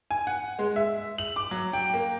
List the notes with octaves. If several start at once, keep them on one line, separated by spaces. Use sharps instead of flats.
G#5
F#5
G#3
E5
F#7
D6
F#3
G5
A#3